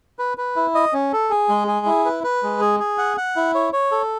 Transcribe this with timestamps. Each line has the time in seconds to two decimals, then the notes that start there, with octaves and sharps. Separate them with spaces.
0.19 B4
0.38 B4
0.56 E4
0.75 D#5
0.93 C#4
1.13 A4
1.30 G#4
1.49 G#3
1.68 G#4
1.86 E4
2.05 B4
2.24 B4
2.43 G#3
2.60 G#4
2.80 G#4
2.98 F#5
3.17 F#5
3.36 E4
3.55 C#5
3.73 C#5
3.92 A4